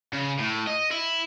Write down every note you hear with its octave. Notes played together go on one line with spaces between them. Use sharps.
C#3
A2
D#5
E4